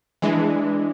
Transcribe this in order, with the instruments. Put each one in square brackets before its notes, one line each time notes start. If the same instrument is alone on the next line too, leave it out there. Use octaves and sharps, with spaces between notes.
[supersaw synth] E3 G#3 [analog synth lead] D4